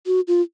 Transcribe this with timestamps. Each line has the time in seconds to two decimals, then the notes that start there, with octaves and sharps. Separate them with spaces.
0.06 F#4
0.28 F4